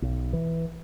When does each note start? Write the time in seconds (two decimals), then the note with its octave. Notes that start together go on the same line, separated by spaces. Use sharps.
0.02 B1
0.33 E3